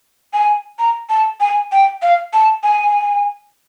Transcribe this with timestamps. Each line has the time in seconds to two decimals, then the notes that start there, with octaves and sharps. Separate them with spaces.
0.33 G#5
0.79 A#5
1.09 A5
1.40 G#5
1.72 G5
2.02 F5
2.33 A5
2.63 G#5